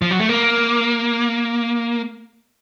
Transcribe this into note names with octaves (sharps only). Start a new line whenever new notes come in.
F3
F#3
A3
A#3